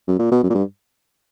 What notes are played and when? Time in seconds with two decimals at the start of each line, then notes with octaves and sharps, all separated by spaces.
0.08 F#2
0.19 A#2
0.31 B2
0.43 F#2
0.50 A#2
0.54 G2